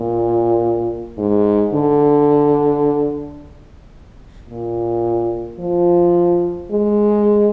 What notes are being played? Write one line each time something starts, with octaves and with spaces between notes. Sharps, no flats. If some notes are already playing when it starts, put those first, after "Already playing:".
Already playing: A#2
G#2
D3
A#2
F3
G#3